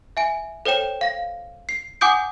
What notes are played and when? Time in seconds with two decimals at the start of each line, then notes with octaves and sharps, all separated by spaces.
0.17 E5 G#5 D7
0.65 A4 C5 C#5 G5 E7
1.01 F5 A#6
1.69 C7
2.01 F#5 G#5 D6 D#6 G6 D7